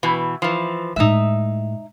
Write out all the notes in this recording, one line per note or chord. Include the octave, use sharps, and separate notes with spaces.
B2 E3
E3 F3
A2 G#3 D#4 E5